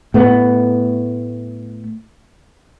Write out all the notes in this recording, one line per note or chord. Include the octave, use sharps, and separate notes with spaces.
A2 A3 B3